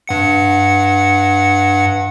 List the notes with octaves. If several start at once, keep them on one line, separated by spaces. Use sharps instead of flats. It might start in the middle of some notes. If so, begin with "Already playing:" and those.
G2 F#5 C#7